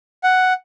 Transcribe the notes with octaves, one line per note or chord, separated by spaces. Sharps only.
F#5